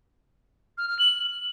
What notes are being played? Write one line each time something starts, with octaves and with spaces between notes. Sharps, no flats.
F6
F6
F#7